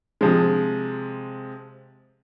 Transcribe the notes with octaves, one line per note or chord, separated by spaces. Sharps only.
C3 F3 G#3